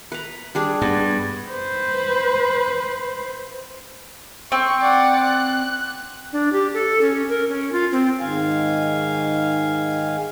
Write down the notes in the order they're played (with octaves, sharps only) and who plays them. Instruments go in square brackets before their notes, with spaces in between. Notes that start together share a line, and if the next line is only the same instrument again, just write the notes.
[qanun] B4 A#5
G3 D4 G#4
[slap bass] G2 [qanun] B3
[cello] B4 C5
[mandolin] C4 [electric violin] C#6
[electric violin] D5 F#5
F#6
[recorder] D4
G4
A4
C#4
A#4
C#4
F4
C4
[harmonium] G#2 D#3 F5 G#5